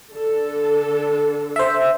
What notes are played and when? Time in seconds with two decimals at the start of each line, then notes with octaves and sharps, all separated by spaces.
0.12 D3 A4
1.56 C5 E5